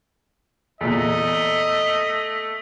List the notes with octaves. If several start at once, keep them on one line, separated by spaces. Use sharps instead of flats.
E2 A#2 A3 D#5